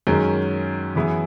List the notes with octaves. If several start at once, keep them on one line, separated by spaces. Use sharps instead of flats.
F#2 D#3 G#3 C#4
F#2 E3 B3 E4 G#4